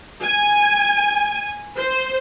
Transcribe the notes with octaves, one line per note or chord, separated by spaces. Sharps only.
G#5
C5